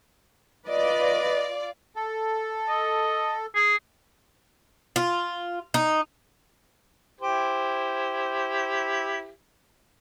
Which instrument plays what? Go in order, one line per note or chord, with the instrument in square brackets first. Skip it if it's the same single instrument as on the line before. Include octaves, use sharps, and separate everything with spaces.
[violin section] F4 D5 [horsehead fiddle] B4 D#5
[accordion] A4
[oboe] D#5
G#4
[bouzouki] F4
D#4
[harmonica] E4 G4 C5